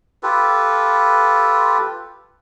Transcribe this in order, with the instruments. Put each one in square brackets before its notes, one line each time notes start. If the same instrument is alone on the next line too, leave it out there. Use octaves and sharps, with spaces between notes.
[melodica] F4 G4 A4 B4